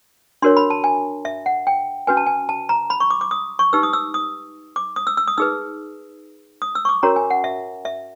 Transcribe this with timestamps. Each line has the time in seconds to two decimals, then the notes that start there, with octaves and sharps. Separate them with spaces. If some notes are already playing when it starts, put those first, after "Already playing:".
0.42 D4 F#4 A#4 C#5 C6
0.57 B5
0.70 A5
0.84 G#5
1.25 E5
1.46 F#5
1.67 G5
2.07 C#4 F#4 B4 G#5
2.17 A5
2.27 G#5
2.49 A5
2.69 A#5
2.90 B5
3.00 C#6
3.11 D6
3.21 D6
3.31 D#6
3.59 C#6
3.73 D#4 G4 B4 E6
3.83 D#6
3.93 E6
4.14 D#6
4.76 D6
4.96 D#6
5.07 E6
5.17 E6
5.27 D#6
5.38 D#4 G#4 B4 E6
6.62 D#6
6.75 E6
6.85 C#6
6.89 D6
7.03 C#4 F#4 A#4 C#5 A#5
7.16 G#5
7.31 F#5
7.44 E5
7.85 E5